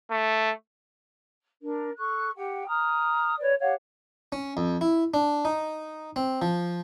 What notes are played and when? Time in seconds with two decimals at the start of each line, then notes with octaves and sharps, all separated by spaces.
0.10 A3
1.60 D4 A#4
1.96 A4 C#6 F#6
2.36 G4 F#5 G5
2.66 A#5 D#6 F6
3.38 B4 C#5 D5
3.60 G4 C#5 F5 F#5
4.32 C#4
4.57 F2
4.81 E4
5.14 D4
5.45 D#4
6.16 C4
6.42 F3